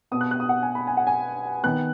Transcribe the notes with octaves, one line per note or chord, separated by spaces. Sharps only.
B2 B3 D#6
F#6
F#6
D#6
F#5
G#5
B5
G#5
F#5
G#5
D#3 B3 F#6